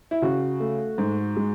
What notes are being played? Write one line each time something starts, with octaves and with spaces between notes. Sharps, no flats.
E4
C#3 F#4
A3
G#2
G#3